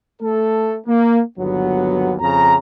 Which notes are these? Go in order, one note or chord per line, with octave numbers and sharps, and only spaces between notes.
A3 A4
A#3
G1 D#2 F#3 B3
F2 C#3 A#5